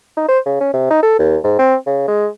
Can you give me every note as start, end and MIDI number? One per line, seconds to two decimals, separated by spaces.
0.17 0.25 63
0.28 0.39 72
0.46 0.60 49
0.60 0.72 61
0.73 0.88 48
0.90 1.02 63
1.03 1.14 69
1.19 1.37 39
1.44 1.56 44
1.59 1.76 60
1.86 2.04 49
2.08 2.28 56